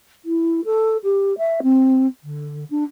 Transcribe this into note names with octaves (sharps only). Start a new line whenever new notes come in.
E4
A4
G4
E5
C4
D3
D4